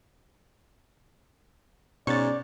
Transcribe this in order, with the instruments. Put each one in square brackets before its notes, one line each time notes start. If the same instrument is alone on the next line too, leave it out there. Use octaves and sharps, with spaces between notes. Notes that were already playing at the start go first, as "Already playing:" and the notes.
[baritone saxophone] G#2 [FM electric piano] B2 C#4 [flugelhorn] D5 [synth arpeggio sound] C#6 A6